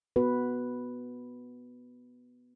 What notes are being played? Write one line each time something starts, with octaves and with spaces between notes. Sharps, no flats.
B3 F#4 B4